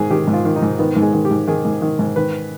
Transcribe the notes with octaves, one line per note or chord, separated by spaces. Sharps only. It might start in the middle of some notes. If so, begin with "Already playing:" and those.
Already playing: G#2 D#3 G#4
D#3 G4
G#2
F4
D#3
D#4
G#2
D#3 B3
G#2
G#3
D#3
G4
G#2
D#3 G#4
G#2
D#3
G#2
D#3 B4